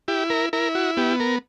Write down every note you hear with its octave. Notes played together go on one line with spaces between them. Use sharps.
E4 G4
A#4
E4 A#4
F#4
B3 G4
A#4